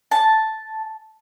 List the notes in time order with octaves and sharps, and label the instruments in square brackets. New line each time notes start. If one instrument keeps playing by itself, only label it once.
[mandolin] A5